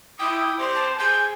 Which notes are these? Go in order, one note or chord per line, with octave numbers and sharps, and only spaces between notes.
E4 G5 D6 D#6
C4 G4 C5 D5
A5
G#4 G#5 G6